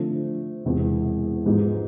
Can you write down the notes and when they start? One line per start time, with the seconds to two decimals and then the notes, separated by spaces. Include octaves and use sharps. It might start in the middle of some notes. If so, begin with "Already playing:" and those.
Already playing: D3 F3 A3 C4
0.65 E1 E2 C3 E3
1.46 G#2 F3 G#3 B3